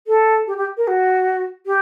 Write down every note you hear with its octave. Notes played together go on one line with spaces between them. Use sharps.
A4
G4
G4
A#4
F#4
G4